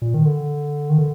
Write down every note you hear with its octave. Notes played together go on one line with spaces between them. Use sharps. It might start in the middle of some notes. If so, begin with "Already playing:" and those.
A#2
D#3
D3
D#3
D3